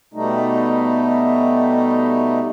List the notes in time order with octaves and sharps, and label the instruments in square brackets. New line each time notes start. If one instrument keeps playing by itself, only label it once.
[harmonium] B2 G3 A3 D#4